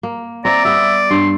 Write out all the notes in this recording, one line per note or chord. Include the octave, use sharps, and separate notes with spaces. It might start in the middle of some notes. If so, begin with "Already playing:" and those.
A#3
C4 D5 E5 G5 A#5
G3 B3 E5
G2 C6